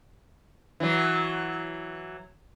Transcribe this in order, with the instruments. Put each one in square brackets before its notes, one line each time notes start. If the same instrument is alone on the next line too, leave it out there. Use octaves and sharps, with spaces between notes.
[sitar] E3 F#3